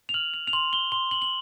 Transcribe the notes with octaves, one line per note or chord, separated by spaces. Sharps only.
F7
F6 F#7
F7
F7
C6 F#7
G7
C6 G7
F#7
F#7